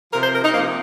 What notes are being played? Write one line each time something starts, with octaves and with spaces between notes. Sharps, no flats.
C3 F3 A#4
C5
A#4
D#4
C3 F3 A#3